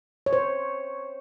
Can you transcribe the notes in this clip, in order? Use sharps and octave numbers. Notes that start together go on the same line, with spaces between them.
C#5
C5